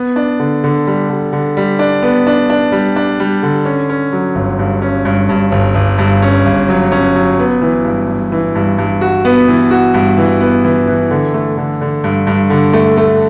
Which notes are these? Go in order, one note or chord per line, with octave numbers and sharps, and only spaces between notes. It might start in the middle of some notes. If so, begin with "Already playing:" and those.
Already playing: B3
D4
D3
D3
G3
D3
D3
G3
D4
B3
D4
D4
G3
D4
G3
D3
C#4
C#4
F#3
G1
G2
C#4
G2
G2
G1
G1
G2
C#4
G1
F#3
C#4
F#3
B3
E3
G2
G2
E3
G2
G2
F#4
B3
E3
F#4
G2
E3
B3
E3
E3
D3
A3
D3
D3
G2
G2
D3
A3
A3